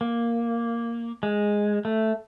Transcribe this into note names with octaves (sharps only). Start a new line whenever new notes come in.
A#3
G#3
A3